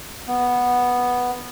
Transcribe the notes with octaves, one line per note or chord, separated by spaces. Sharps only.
B3